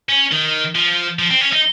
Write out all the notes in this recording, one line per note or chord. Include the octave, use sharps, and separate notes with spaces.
C#4
D#3
F3
F3
C4
C#4
D#4